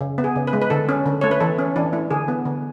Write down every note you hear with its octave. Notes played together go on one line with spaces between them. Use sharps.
C#3
B3
G#4
C#3
B4
G#3
B4
D3 A4
C#4
D3
A3 C#5
B4
E3 A4
C#4
E3 D4
A3 E4
D3 G#4
B3
D3